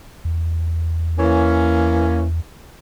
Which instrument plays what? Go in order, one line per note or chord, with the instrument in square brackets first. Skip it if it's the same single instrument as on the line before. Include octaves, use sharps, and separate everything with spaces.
[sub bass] E2
[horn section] E3 A#3 C#4